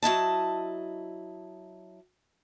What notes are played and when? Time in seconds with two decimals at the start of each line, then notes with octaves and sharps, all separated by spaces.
0.03 F#3 E4 D#5 A5